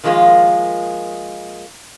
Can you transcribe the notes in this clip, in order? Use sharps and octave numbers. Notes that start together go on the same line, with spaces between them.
D#3 F3 G#3 A#3 F4